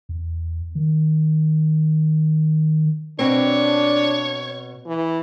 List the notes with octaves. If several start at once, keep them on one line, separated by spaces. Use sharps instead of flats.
E2
D#3
B2 C4 D4 C#5
E3